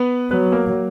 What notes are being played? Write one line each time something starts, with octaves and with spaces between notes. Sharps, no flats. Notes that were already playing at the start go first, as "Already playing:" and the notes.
Already playing: B3 B4
F#3 B3 B4
A#3 A#4